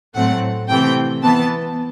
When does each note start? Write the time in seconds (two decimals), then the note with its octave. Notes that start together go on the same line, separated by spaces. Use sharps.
0.15 A2 F#3 A3 C4 F#5
0.69 C3 E3 A3 C4 G5
1.23 E3 B3 A5